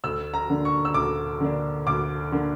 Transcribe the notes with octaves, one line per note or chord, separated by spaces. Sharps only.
D2 E6
A#5
D3 A#3 D4
C#6
E6
D2 D6
D3 A#3 D4
D2 D6
D3 A#3 D4